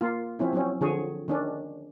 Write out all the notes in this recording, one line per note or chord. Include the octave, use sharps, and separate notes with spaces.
A#3 F4
F3 C4 C#4 E4
F#3 C4 C#4
D3 F3 G#4 C#5
D#3 C#4 D4